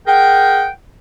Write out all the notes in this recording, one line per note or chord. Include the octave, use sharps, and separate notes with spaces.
G#4 A#4 F#5 G5